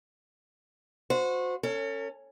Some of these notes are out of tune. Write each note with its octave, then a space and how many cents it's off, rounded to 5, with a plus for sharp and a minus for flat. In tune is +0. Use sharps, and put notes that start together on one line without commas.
F#4 -30 C5 -20
C#4 +0 A4 +35